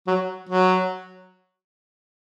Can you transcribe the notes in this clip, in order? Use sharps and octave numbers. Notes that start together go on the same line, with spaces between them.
F#3
F#3